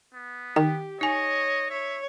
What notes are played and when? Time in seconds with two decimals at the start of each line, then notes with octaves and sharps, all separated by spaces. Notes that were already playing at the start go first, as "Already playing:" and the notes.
0.15 B3
0.56 D#3 G4 G5
1.01 D#4 C#5 D#5 G#5
1.70 C#5 E5